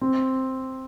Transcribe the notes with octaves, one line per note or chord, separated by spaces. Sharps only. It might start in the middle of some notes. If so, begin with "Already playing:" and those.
C4